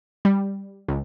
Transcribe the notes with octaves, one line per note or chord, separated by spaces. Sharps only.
G3
C#2